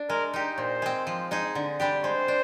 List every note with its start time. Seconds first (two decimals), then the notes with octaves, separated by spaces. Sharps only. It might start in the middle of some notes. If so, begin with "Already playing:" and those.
Already playing: D4
0.10 G#3 A#4
0.34 D#4 G4
0.58 A#2 C5
0.82 G#3 C4
1.07 F3
1.31 G#3 D#4 G#4
1.55 D3
1.80 G3 D4 G4
2.03 G#3 C5
2.28 D4